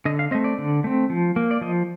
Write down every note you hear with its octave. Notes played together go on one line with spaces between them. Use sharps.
D3 D#5
F5
A3 C4 D#5
D5
D3
A3 C4
F3
A#3
D5
F3 D#5